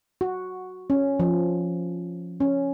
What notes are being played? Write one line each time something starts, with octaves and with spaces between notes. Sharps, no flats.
F#4
C#4
F3
C#4